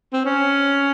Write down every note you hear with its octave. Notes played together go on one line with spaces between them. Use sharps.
C4
C#4